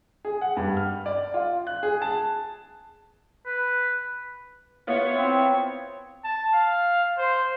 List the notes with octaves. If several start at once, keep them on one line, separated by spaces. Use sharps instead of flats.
G#4
F#5
G2
F6
D5
F4
F#6
G#4
A5
B4
B3 E4 F4 C#5
C4
A5
F5
C5